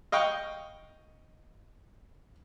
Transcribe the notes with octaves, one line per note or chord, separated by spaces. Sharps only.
D#5 F5 G5 C#6